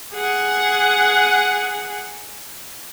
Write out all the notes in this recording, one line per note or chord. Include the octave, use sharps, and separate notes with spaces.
G#4 F#5